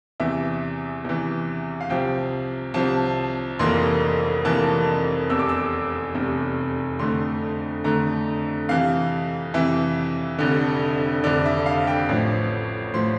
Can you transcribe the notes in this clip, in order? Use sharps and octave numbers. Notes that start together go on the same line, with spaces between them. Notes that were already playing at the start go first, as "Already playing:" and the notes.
E2 C3 E3 E5
E2 C3 E3
F5
C2 C3 F3 G5
C2 C3 F3 A5
F1 F2 E3 A#3 C6
F1 F2 E3 A#3 A5
F1 E2 C3 E6
D6
E6
F1 E2 C3
F2 D3 A3 C6
F2 D3 A3 A#5
F2 C3 E3 F5
F2 C3 E3 E5
F1 F2 D3
F1 F2 D3 D5
E5
F5
G5
A1 A2 F3
A2 F3 C6